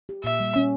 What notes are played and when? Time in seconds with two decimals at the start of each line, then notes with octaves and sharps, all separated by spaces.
0.09 G4
0.24 A#2 E5
0.40 G3
0.56 C#4